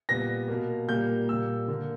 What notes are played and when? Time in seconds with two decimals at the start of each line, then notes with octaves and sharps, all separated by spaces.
0.09 A#2 G3 B3 A#6
0.48 B2 A#3
0.88 A#2 G3 A#3 G6
1.29 A#2 G3 A#3 E6
1.68 D3 A#3